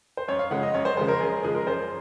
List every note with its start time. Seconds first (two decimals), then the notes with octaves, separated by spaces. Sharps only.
0.17 C5
0.28 F#2 C#5
0.39 F5
0.51 C#3 F3 G#3 F#5
0.63 D#5
0.74 F#2 C#5
0.85 C5
0.97 C#3 F3 G#3 C5
1.08 A#4
1.20 F#2 G#4
1.32 A#4
1.43 C#3 F3 G#3 G#4
1.55 A#4
1.66 F#2 C5